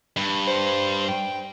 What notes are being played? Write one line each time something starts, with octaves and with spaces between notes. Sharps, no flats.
G2
C5
G5